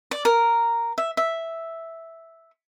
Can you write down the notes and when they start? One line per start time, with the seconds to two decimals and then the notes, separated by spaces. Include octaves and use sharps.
0.11 D5
0.25 A#4
0.98 E5
1.17 E5